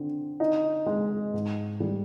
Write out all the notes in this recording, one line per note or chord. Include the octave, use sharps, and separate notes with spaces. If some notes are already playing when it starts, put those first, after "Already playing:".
Already playing: D3 C4
D#4
G#3
G#2
G3